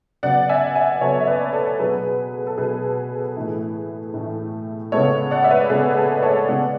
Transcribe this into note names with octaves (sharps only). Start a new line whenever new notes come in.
C#3 F#3 B3 D5 F#5
E5 G#5
E5 G#5
C#3 F#3 B3 A4 C#5
E5
B4 D5
A4
B2 F#3 B3 G#4 B4
A4
B2 F#3 B3 G#4 B4
A2 E3 A3
A2 E3 A3
C#3 G#3 B3 A4 C#5
D5 F#5
E5
B4 D5
C#3 G#3 B3 G#4 B4
B4
A4
D5
A4 C#5
C#3 G#3 B3 D5 F#5